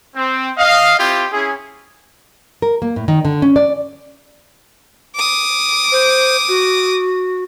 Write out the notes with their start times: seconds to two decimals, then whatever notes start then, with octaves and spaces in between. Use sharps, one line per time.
0.16 C4
0.58 D#5 F5
0.99 C4 E4 F4 G4 G5
1.32 C#4 E4 G#4
2.62 A#4
2.82 A#3
2.96 A2
3.08 D#3
3.25 D3
3.42 C#4
3.56 D5
5.16 D6 D#6
5.92 C5
6.49 F#4